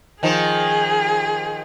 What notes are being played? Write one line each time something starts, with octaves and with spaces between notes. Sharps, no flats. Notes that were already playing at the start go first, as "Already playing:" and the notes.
D#3 F3 G#4